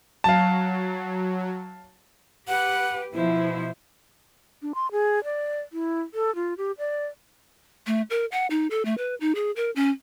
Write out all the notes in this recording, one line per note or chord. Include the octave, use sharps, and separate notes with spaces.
F#3 F5 A5
G4 B4 F#5
B2 F3 E4 C5
D4
C6
G#4
D5
E4
A4
F4
G4
D5
A3
A#4
F#5
D#4
A4
A3
B4
D#4
G#4
A#4
C#4